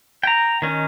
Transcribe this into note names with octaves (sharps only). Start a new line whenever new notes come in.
G5 A#5
D#3 C#4 D#4